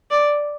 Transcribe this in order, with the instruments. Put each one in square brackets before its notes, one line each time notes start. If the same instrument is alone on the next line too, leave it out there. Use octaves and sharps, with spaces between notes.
[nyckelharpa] D5